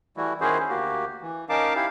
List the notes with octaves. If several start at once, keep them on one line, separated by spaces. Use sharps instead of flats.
E3 G3 A3 E4 F#4
D#3 C#4 E4 F#4 G#4 C5
D2 A#3 F#4 G4
E3
C#4 D#4 A#4 F5 A5 D6
E4 G4 F5